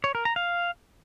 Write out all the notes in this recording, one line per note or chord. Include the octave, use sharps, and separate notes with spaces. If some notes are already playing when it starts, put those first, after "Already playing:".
C#5
A#4
A#5
F5